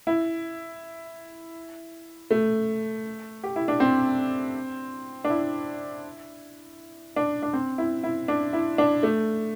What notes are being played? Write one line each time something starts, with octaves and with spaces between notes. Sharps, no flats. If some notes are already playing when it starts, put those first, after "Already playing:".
E4
A3
G4
E4
D4
C4
D4
E4
D4
D4
C4
E4
E4
D4
E4
D4
A3